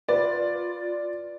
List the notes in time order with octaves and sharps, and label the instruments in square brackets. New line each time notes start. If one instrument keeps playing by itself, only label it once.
[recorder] F4 [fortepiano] B4 [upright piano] D5